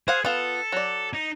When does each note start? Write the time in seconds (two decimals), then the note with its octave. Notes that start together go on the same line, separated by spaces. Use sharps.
0.08 G#4 C5 F5 F#5
0.25 B3 F4 A4
0.72 F#3 D5
1.13 D#4